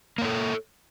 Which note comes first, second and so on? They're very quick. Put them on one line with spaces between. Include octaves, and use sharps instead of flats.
A#3 C#5 A4